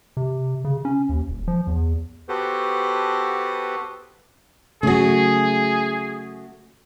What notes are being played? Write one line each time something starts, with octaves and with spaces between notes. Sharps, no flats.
C3
C#3
C#4
D#2
D#1
F3
E2
B3 F#4 G4 A4 B4 C5
C#3 F#3 A3 F#4 G#4